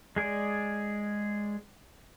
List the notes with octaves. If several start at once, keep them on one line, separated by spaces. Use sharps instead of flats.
G#3 G#4 D5